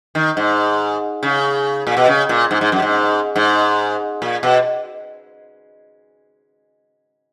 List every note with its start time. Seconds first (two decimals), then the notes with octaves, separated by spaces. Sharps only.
0.15 D#3
0.37 G#2
1.23 C#3
1.87 A#2
1.97 B2
2.08 C#3
2.29 A#2
2.51 G#2
2.61 G#2
2.72 F#2
2.82 G#2
3.36 G#2
4.22 A#2
4.43 B2